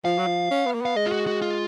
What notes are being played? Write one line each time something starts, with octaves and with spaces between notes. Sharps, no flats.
F3 F5
F#3
F3
C#4
B3
A#3
B3 F5
G#3 D#5
F4
F#4
F#4
F4